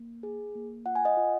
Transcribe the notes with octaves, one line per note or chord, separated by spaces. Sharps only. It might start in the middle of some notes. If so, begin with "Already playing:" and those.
Already playing: A#3
G#4
A#3
F4 F#5
G#5
D#5 F#5
F4